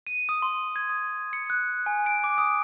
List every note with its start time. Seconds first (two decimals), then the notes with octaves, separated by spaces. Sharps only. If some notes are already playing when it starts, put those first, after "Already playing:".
0.07 D#7
0.29 D#6
0.42 C6
0.76 G#6
0.89 D#6
1.33 C#7
1.50 F#6
1.86 G#5
2.06 D7
2.24 D6
2.38 D#6